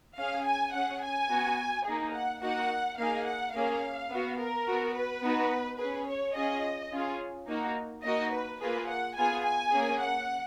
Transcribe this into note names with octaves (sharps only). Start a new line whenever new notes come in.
C#4 G#4 F5
G#5
C#4 G#4 F#5
G#5
B3 F#4
A#3 D#4 G#4
F#5
A#3 D#4 F#4 F#5
A#3 D#4 G#4 F5
F#5
A#3 C#4 G#4 F5
B3 F#4
A#4
B3 F#4
B4
B3 D#4 F#4
C#4 G#4 B4
C#5
C#4 F4 G#4 D#5
C#4 F4 G#4
A#3 D#4 F#4
A#3 D#4 F#4 D#5
B4
A#3 F4 G#4 B4
F#5
B3 F4 G#4 G#5
G#5
A#3 C#4 G#4
F#5